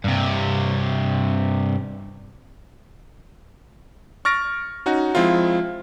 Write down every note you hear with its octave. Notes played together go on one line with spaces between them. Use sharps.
G2 C3
C#6 F6 A6 A#6 D7
C#4 D#4 F#4
F3 G#3 C4 E4 F4